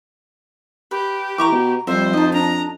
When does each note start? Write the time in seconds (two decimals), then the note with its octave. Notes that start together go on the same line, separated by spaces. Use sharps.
0.91 G4 B4
1.38 E3 A#5 C#6 D6
1.52 B2
1.87 F2 G3 C5 E5
2.13 D#4 D#5 A5
2.33 D4 A#5